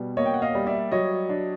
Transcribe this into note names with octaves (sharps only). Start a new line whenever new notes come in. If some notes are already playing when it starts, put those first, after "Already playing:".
Already playing: B2 G3
A#3 C#5 D#5
G5
F#5
D#5 F5
G3
D5 E5
F#3 C#5 D#5
D4